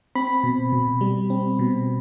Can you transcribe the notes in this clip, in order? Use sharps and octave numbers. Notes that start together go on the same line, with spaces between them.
C4 B5
B2
B2
G3
C4
B2